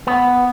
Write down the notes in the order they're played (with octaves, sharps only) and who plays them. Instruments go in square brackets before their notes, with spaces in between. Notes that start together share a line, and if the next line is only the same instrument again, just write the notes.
[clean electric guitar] B3